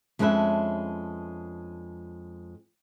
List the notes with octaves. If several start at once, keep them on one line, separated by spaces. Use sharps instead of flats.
F2 G#3 C#4 D4 B4 E5